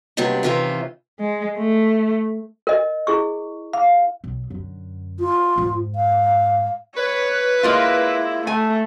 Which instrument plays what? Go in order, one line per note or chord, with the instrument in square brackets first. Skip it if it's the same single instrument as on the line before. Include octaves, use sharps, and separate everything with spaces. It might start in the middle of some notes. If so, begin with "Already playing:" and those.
[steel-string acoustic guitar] D#2 C3 F#3 G3 B3 D4
C3 D#3 E3 C#4 F4 E5
[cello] G#3
A3
[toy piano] A#4 D#5
E4 G#4 C#6
[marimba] F5
[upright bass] B1
F#2 D3
[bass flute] F4
[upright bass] F2 G#2
[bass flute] F5
[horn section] B4 [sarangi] C#5
[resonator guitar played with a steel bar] G#3 A#3 F4 [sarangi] E4
[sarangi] A3 [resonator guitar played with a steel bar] G#5